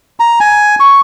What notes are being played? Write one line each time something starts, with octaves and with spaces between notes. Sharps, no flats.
A#5
G#5
C#6